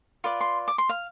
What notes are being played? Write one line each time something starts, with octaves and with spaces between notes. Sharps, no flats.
F4 B4 D5
C6
D6
C6
F5